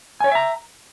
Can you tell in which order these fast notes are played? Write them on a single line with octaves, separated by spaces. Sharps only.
G#5 C#5 G5 E5 A#5